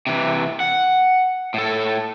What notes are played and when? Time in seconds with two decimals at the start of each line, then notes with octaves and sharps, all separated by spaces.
0.07 C3 E3
0.60 F#5
1.54 A2 A4